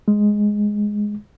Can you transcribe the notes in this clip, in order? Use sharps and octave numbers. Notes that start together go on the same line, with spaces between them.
G#3